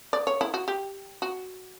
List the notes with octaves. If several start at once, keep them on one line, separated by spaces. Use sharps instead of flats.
D5
C#5
E4
F#4
G4
F#4